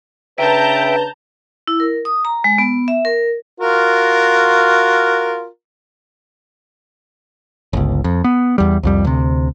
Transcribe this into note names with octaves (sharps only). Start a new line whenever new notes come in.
C#3 D4 B4 E5 G5 A5 A#5 G6
E4
A#4
D#6
A#5
G#3
B3
E5
A#4
F4 F#4 A#4
G1 C#2
F2
B3
E2 G3
C2 F2 G3
D2 C3